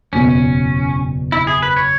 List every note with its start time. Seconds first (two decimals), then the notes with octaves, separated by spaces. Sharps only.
0.13 F#1 E2 B2 C#4
1.32 E4
1.47 G#4
1.62 B4
1.77 C#5